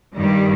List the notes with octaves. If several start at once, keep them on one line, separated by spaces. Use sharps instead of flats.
G2 D#3 G3